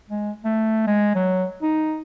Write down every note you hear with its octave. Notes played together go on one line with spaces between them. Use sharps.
G#3
A3
G#3
F#3
D#4